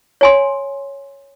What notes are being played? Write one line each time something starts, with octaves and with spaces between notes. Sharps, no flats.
C#5 G#5 C6